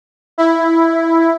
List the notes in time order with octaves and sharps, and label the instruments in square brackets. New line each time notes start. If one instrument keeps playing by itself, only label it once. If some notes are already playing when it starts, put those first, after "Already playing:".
[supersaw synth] E4